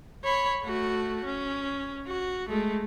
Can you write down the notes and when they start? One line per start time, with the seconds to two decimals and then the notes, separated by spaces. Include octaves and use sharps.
0.24 C#5 B5
0.64 A3 F#4
1.25 C#4
2.07 F#4
2.49 G#3 A3